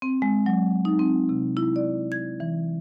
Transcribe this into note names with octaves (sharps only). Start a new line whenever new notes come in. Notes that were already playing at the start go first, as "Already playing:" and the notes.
C4
G#3
F#3
D#4
C4
C3
E4
D5
G#6
E3